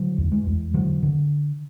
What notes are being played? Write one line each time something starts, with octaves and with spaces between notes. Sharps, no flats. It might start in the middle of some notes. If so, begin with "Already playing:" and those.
Already playing: D3 F#3
E2
G#3
E2
D3 F#3
D3